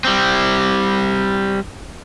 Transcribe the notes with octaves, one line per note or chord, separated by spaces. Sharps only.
G3 C4